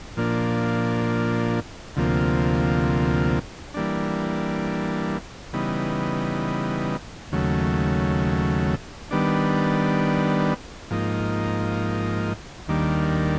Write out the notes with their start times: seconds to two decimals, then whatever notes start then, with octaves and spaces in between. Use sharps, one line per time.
0.17 A#2 F3 A#3 D4
1.96 D2 C3 F3 A#3
3.74 E3 G3 A#3 D4
5.53 C#3 E3 G3 B3 D#4
7.32 D#2 C#3 F#3 A3
9.11 D#3 G3 B3 D4
10.90 G#2 F3 A#3 D#4
12.68 D#2 D#3 G3 A#3 D4